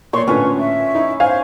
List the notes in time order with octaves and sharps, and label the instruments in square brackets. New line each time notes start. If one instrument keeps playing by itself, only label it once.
[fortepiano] A#2 D5 [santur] C#5 C#6 [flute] C6
[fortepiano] A2 D3 F4 [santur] C#4 [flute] B4
[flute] E5
[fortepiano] D#4 E4
[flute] C5 [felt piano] F5 [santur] G#5